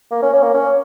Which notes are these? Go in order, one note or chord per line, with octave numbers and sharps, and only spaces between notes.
A#3
C#4
C#4
A#3
C#4